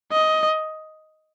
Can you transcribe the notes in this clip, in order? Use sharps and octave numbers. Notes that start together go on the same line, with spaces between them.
D#5